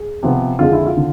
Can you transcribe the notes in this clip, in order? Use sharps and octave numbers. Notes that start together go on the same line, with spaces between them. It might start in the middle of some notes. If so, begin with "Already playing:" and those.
Already playing: G#4
C3 F3 B3
F2 D3 G#3 F4
E4
F4
D3